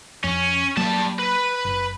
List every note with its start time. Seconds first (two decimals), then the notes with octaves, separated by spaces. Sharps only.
0.24 F2 C#4
0.77 F#3 G3 A#3 A5
1.19 B4
1.65 F#1